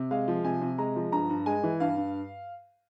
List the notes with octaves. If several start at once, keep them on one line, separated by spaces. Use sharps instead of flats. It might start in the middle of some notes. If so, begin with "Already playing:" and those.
Already playing: C3
G#3 F5
F3
C3 G#5
C3
G#3 A#5
F3
G2 A#5
G2
G#3 G#5
E3
G2 F5
G2